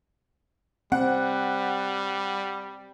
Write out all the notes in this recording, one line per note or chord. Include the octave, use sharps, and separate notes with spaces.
G3 C4 F#5